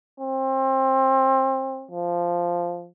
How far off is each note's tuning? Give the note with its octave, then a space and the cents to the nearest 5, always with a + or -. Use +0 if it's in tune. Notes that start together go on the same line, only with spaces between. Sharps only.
C4 +25
F3 -5